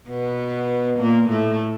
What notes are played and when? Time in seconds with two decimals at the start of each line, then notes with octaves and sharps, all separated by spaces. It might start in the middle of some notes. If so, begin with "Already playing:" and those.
0.09 B2 B3
0.99 A#2 A#3
1.29 A2 A3